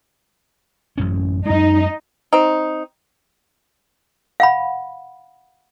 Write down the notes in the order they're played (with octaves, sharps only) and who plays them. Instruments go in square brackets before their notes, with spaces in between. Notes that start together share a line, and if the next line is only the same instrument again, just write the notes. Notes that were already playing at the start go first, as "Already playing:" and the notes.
[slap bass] A1 F#2 C#4
[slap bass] F#2 G#3 [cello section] D#4
[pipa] C4 D#4
[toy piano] F5 F#5 B5